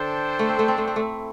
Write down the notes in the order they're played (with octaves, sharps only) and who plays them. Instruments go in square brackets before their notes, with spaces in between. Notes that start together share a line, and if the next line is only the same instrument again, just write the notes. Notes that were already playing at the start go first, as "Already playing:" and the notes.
Already playing: [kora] D3 [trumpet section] D4 A4 C5 G5
[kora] A3
C4
A3
C4
A3
C4
A3
[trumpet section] E4